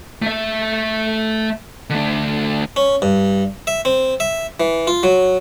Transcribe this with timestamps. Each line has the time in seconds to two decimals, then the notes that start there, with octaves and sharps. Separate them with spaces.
0.22 A3 E5
1.90 D3 A3
2.76 C#4
3.02 G2
3.67 E5
3.85 C4
4.20 E5
4.60 E3
4.87 F4
5.03 F#3